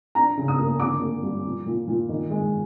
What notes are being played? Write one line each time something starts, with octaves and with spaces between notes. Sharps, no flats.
D4 A#5
C#3
D#6
A#3
D3 D6
A#3
G3
A#2
A#2
A#2
D#3
G#3